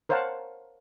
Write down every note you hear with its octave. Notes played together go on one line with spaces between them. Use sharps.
A#4 C5 C#5 F5 F#5 A5